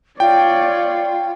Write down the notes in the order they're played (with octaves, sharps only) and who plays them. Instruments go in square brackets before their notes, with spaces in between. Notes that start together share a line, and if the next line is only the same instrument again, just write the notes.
[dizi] F4 [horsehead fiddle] C#5 D5 [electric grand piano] G5